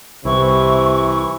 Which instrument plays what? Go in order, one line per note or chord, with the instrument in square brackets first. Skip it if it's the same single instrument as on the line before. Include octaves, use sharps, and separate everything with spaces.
[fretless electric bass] C2 [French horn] C3 [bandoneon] E3 E4 [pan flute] C#6